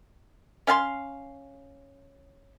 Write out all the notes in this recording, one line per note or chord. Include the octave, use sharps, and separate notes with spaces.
C#4 F5 G#5 C6